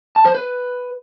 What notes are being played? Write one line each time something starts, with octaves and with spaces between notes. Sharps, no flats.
A5
C5
B4